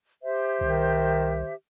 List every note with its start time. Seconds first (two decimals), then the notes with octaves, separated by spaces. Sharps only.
0.22 G4 C5 E5
0.61 C2 D#3